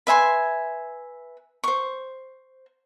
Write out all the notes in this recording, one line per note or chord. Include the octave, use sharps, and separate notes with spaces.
B4 E5 G#5 C6
C5 C#6